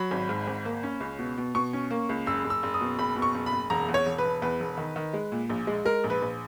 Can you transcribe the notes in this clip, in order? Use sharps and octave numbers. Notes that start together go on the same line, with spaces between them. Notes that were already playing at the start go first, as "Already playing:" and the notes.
Already playing: F#3 B5
G#1
G#2
G#1
A#3
C#4
C#2
B2
B2
B2 C#6
C#4
A#3
C#2
F#1 E6
F#1
E6
F#1
D#6
B2
F#1 B5
B2
C#6
F#1
B5
F#1
E1 A#5
E2
C#5
E1
B4
E1
E2 B4
E1
D#3
D#3
G#3
A#2
A#1
G#3
G#3 A#4
A#1
B4
A#1